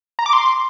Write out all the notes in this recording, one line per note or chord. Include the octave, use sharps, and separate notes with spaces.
A#5
D6
C6